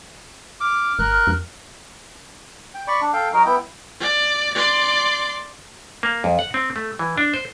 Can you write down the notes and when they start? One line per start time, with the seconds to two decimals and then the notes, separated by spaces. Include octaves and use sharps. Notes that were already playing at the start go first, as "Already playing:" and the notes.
0.61 D6 F6
0.99 G1 A#4 F#6
1.27 F2
2.75 G5
2.88 D5 B5 C#6
3.01 D4
3.13 A4 F5 G5
3.33 F#3 D#4 A#4
3.46 B3 E4 G5
4.00 D5
4.54 D5 C6
6.03 A#3
6.24 F2
6.39 F#5
6.54 C4
6.76 A3
6.99 E3
7.18 D4
7.34 C5